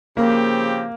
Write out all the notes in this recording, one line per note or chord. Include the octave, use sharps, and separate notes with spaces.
C#3 F3 A#3 C4 G4